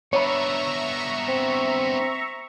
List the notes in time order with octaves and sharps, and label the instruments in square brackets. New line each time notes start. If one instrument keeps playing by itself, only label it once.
[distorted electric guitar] B3 D4 [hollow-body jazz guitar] C#5 B5 [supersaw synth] E5 A#5 C#6
[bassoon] C4